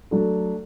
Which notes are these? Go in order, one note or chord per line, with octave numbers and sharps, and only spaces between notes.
F#3 A3 D4 A4